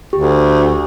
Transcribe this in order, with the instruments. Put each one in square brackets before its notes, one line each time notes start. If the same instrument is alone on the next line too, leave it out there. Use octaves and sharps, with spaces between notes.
[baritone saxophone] D2 [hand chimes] G4